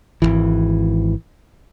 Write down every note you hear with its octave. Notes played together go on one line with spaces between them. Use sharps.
G#1 C#2 E3